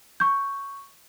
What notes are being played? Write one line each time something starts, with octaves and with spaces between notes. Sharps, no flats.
C#6 G6